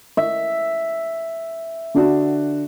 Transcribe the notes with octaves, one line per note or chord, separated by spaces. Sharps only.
E5
D3 D4 F#4